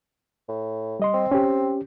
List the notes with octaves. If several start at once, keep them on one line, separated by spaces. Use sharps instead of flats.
A2
G3 D#5 C6
C4
C#4 G4